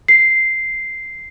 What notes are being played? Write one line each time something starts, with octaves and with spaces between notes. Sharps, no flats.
C7